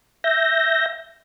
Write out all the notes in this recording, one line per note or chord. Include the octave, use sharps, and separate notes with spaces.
E5 G6 A#6